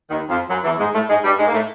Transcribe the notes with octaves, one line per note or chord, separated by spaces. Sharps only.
D#2 D#3
F2 F3
F#2 F#3
E2 E3
G#2 G#3
A2 A3
G#2 G#3
G2 G3
G#2 G#3
A#3
A2 A3